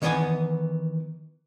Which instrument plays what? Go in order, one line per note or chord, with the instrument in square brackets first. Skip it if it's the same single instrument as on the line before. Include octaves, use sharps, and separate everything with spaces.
[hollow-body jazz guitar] D#3 E3 B3 D#5 F#5 G#5